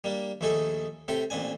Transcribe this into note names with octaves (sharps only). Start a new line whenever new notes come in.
G3 A#3 D4
A#1 D#2 A3 D#4 G#4 A4
A2 C3 A4 G5 C6
A1 A#2 C4 D4 G#5